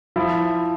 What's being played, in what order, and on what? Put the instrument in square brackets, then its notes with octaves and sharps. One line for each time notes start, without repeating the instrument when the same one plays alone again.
[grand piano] F3 E4